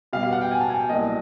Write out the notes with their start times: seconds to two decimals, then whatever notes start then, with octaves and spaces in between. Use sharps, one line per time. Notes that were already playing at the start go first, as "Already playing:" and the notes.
0.13 B2 G3 B3 F5
0.23 F5
0.32 F#5
0.41 G5
0.51 G#5
0.61 A5
0.70 G#5
0.79 G5
0.89 C2 B2 F#3 A#3 D#5